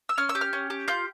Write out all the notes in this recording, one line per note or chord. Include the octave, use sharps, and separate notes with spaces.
E6
C#4 F6
E6
G4
F6
C#4
G4
F4 G6